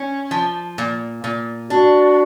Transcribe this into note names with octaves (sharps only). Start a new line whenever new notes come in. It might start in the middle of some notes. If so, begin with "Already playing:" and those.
Already playing: C#4
F3
A#2
A#2
D4 F#4